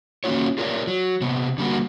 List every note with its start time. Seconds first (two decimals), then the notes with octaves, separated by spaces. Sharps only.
0.24 D#3 A#3 C#4 F4 F#4 C#5
0.58 F4 G4 A#4 C#5 D5
0.87 F#3
1.21 C3 B3
1.58 D3 G3 A#3 F#4